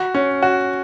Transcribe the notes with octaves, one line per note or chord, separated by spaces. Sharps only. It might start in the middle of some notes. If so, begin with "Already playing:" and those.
Already playing: F#4
C#4
F#4